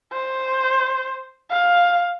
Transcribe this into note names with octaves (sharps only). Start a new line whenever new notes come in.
C5
F5